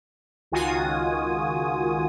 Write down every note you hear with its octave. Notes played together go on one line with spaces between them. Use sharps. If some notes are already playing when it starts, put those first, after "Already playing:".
C#2 D#3 F4 F#4 G#5 D#6